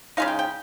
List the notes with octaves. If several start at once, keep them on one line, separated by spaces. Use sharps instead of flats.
C#3 G#3 D#4 F5
G5
G5